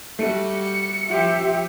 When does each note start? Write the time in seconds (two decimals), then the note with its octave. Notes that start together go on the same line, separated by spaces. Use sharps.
0.19 G3 A3 F#4 C#7
1.09 F3 G4 E5